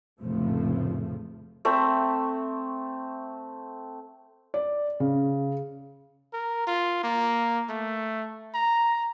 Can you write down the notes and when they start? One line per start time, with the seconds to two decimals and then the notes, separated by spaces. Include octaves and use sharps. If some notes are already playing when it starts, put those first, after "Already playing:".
0.21 F1 A#1 A2 C#3 F3 A3
1.65 A3 C4 E5
4.54 D5
5.00 C#3
6.33 A#4
6.67 F4
7.03 A#3
7.69 A3
8.54 A#5